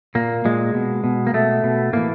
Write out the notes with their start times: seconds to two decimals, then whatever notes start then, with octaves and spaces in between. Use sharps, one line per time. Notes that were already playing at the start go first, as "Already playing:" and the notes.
0.15 A#2 A#3
0.45 A#2 G#3
0.74 B2
1.04 B2
1.27 A#3
1.34 B2 A3
1.64 B2
1.93 A2 E3 A#3